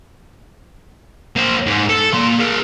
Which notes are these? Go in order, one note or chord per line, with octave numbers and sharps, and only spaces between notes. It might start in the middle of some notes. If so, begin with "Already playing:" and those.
A#3 C5
G#2
A4
A#3 C6
G#4 A#4